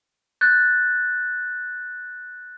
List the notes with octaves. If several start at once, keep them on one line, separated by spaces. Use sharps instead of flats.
F#6 G6 A6